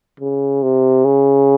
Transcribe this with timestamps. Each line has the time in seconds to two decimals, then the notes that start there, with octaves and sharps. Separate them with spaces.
0.20 C#3
0.63 C3
1.05 C#3